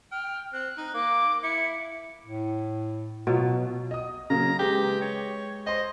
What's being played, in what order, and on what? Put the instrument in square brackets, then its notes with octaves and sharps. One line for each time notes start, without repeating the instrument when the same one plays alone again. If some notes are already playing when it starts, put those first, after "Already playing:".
[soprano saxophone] G5 [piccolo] F6
[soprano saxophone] C4 [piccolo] F#6
[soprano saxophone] D#4
[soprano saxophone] A#3 [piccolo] D6
[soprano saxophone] E4 [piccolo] C#7
[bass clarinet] A2
[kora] B2 F#3 [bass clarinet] F4
[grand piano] D#5 D#6
[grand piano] C#3 F#3 A#3 [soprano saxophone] A#5
[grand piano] G#3 B4 [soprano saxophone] G4
[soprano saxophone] C#5
[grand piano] C5 C6 [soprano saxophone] D#5